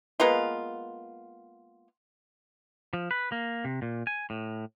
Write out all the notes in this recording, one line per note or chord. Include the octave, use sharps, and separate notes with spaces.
G#3 A#3 B3 F4
F3
B4
A#3
C3
A#2
G#5
A2